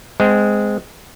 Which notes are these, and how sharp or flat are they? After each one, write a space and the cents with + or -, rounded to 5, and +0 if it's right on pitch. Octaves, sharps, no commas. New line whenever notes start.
G#3 +0 C4 -25